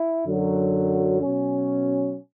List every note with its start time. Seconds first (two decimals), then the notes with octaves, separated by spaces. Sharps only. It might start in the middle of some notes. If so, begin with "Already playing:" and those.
Already playing: E4
0.25 F#2 D3 F#3
1.21 B2 F#3 C#4